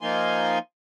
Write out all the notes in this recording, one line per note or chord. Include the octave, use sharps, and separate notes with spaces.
F3 A#3 D#4 F4 G#5 C6